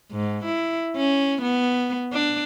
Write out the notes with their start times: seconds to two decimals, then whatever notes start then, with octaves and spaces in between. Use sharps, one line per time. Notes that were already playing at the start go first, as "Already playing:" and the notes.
0.12 G#2
0.45 E4
0.97 C#4
1.42 B3
2.13 D4